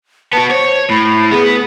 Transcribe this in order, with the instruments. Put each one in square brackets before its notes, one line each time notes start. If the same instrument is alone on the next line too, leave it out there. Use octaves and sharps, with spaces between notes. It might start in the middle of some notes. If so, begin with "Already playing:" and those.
[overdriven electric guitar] B3 F#4 [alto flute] A5
[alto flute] C5 [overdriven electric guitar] C#5
[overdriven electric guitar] A2 [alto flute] B5
[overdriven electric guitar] B3 B4 [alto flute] G#4